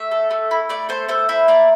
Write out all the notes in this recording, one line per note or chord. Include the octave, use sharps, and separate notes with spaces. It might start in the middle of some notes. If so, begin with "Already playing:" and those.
Already playing: A3 E5
A4
A3
E4
A3 D5
A4 C5
A3 C5
E4 C5
A#3 D5